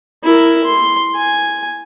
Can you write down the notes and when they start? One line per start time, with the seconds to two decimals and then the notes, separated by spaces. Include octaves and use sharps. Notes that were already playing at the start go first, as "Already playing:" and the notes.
0.23 E4 A#4
0.64 C6
1.15 G#5